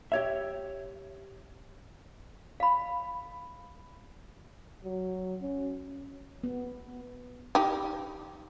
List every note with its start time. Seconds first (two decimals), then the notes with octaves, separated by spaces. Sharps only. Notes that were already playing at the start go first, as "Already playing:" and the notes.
0.12 G4 C#5 E5
2.60 F5 B5
4.84 F#3
5.42 C#4
6.44 B3
7.55 D#4 G4